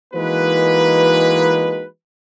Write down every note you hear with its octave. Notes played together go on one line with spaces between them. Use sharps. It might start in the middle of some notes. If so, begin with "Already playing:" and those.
E3 G#3 A#3 D#4 F#4 B4